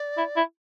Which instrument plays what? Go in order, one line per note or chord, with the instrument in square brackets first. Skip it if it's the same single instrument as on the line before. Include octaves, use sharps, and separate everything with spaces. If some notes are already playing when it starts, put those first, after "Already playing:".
Already playing: [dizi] D5
[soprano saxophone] E4
E4